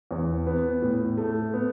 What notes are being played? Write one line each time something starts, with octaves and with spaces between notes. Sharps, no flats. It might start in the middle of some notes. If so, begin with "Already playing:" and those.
E2
B3
A2
A3
B3